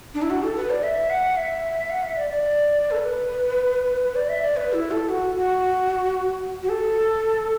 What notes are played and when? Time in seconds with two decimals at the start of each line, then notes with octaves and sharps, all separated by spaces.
0.15 D4
0.22 E4
0.30 F#4
0.43 A4
0.56 B4
0.70 D5
0.83 E5
1.10 F#5
1.37 E5
1.90 F#5
2.03 E5
2.16 D5
2.30 D5
2.91 A4
2.96 B4
4.03 B4
4.15 D5
4.29 E5
4.42 D5
4.57 B4
4.73 E4
4.91 A4
5.09 F#4
5.36 F#4
6.63 F#4
6.69 A4